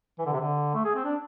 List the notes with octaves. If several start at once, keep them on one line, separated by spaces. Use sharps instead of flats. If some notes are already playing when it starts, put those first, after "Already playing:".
E3
D3
C3
D3
A3
G#4
C4
D4